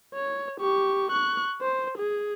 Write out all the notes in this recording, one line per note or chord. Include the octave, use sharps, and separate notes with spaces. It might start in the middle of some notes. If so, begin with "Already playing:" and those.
C#5
G4 C#6
C#6 F#6
C5
G#4